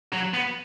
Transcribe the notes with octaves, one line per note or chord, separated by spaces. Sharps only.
F#3
B3